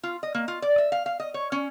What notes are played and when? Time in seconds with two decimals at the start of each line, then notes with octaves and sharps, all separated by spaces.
0.03 F4
0.23 D#5
0.35 A#3
0.48 F4
0.62 D5
0.78 E5
0.92 F5
1.06 F5
1.20 D#5
1.34 C#5
1.52 C#4